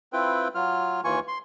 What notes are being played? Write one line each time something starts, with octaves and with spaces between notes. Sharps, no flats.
C4 E4 F4 B4 G5
F#3 F4 F6
D#2 E3 F4 G#5 C#6
C6